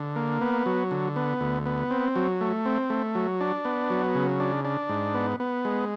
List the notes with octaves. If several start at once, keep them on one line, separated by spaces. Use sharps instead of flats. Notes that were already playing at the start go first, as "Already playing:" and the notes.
Already playing: D3
A#3
B3
F#3
D3
B3
D2
B3
C4
F#3
A3
C4
A3
F#3
D4
B3
F#3
C#3
D4
D4
G#2
B3
B3
G#3